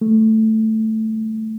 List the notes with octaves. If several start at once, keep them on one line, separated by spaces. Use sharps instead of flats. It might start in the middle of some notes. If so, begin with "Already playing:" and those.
A3